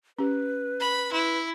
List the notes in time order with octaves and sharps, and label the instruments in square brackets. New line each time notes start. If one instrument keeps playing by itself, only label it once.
[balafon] C#4 G4 [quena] B4
[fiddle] B5
[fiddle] E4 [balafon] C6